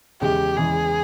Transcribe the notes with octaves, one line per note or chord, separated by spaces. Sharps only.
E2 C#3 E3 G#3 G4
E2 C#3 E3 G#3 G#4